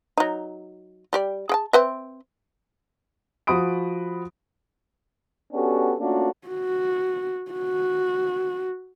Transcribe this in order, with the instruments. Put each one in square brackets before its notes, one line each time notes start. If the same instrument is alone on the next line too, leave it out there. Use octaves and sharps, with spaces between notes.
[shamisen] F#3 D#4
G3 G4 D5
G#4 G5 A5
C4 B4 E5
[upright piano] F3 F#4 B5 D#6 D7
[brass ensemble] B3 C#4 D4 F#4 G4 A4
A3 A#3 C#4 D4 F4 F#4
[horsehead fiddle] F#4
F#4